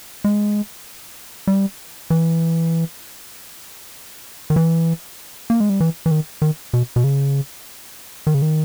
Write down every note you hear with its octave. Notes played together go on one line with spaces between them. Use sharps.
G#3
G3
E3
D#3
E3
A#3
G#3
G3
E3
E3
D#3
D#3
B2
B2
C#3
D#3
C#3
D#3